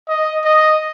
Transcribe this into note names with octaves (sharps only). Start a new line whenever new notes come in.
D#5
D#5